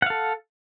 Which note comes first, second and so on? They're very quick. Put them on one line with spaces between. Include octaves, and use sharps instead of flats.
F#5 F5 A4